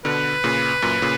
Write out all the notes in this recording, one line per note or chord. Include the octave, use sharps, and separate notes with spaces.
B2 D3 B4
A#2 C#3
F#2 A#2
A#2 C#3